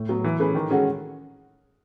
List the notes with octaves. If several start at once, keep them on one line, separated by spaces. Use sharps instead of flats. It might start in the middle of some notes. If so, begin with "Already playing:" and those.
Already playing: A2
F#3 B3
E3
A3 C#4 G#4 B4
D#3
G#3 C#4 F#4 A4